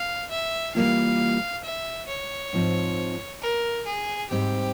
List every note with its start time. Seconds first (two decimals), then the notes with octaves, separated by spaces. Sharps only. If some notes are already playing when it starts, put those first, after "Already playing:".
Already playing: F5
0.30 E5
0.75 E3 G3 A#3 F4 F5
1.64 E5
2.08 C#5
2.53 G#2 F3 C4
3.42 A#4
3.87 G#4
4.31 G#2 G3 C4 G4